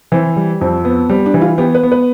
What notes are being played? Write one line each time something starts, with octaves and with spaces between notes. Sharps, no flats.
E3 C4
G3
F2 C4
B3
G3 C4
D4
E3
F4
B3 G4
B4
B3
B4